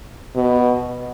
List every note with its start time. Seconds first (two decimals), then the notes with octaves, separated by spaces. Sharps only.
0.36 B2